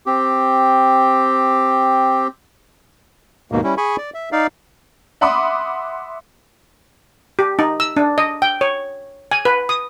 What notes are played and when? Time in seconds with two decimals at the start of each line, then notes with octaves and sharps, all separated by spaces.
0.06 C4 G4
3.52 D#2 G#2 B2 A#3
3.64 G3 C#4 E4
3.77 G#4 G#5 B5 C#6
3.98 D5
4.14 E5
4.32 D#4 D5 F5
5.21 E5 F#5 B5 C6 D6 D#6
7.39 G4
7.59 D#4
7.80 E6
7.97 D4
8.18 D#5
8.42 G5
8.61 C#5
9.31 G#5
9.45 B4
9.69 D#6